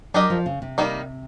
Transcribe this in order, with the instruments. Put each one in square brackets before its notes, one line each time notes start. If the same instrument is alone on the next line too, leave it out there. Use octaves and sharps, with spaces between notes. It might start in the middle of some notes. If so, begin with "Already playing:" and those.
[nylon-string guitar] F#3 [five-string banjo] D4 G4 A#4 D#5
[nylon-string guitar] F3
C#3
C3
[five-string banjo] D#3 G3 A#3 D#4